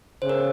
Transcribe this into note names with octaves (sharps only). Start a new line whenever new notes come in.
C#3 C5
A#4